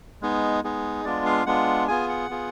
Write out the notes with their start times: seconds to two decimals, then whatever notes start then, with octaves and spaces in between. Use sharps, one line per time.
0.22 G#3 B3 D#4 G#4
0.64 G#3 B3 D#4 G#4
1.05 G#3 B3 D4 F4 D5
1.26 F5
1.46 G#3 B3 D4 F4 F#5
1.88 B3 F4 G#4 G#5
2.09 F#5
2.30 B3 F4 G#4